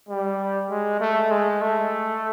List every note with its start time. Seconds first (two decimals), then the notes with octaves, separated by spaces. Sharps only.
0.09 G3
0.70 G#3
1.00 A3
1.31 G#3
1.61 A3